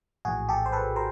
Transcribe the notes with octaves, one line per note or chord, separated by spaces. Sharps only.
A#1 A2 E3 F#4 G#4
G4 A4
C5
A4 B4
A#4 C5